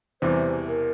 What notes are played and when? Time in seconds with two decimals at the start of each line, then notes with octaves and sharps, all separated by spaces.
0.22 E1 E2 C3 E3 G3 C5
0.68 A#4